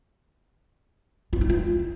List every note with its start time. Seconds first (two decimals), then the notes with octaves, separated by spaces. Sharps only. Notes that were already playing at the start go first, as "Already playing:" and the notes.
1.33 F4
1.41 D#4
1.49 F4